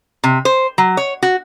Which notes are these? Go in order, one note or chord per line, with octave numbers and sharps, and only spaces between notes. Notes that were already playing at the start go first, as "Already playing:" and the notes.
C3
C5
F#3
C#5
F#4